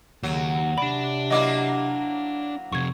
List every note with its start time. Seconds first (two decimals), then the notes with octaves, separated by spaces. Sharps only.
0.23 D#2 C#3 F#3
0.78 C3 D4 D5 B5
1.30 F#3 A#3 E4 D#5 D6
2.72 F2 C3 C#6 G#6